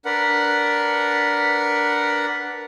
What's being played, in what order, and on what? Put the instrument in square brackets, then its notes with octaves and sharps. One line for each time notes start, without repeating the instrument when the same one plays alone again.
[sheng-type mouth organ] D4 A#4 B4 F#5